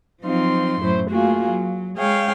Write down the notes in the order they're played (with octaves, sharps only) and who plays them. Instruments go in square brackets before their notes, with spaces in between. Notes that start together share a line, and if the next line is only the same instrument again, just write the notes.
[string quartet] F3 F#3 C4 D#4 F4 C6
F#2 A2 F#3 E4 C5
A3 A#3 F4 F#4 G#4
F#3
G#3 G#4 C#5 F5 G5